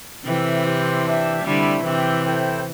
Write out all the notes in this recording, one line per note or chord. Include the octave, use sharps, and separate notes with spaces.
C3 E3 E4 A4 E5 G5
C4 E4 G4 C5
D4 G4 E5 G5
D3 G3 A3 C4 E4
C3 E3 C4 G4 E5 G5
E4 A4 C5 G5